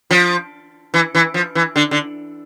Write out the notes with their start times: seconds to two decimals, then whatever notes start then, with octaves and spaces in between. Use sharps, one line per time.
0.11 F3
0.94 E3
1.15 E3
1.34 F3
1.55 E3
1.76 D3
1.91 D3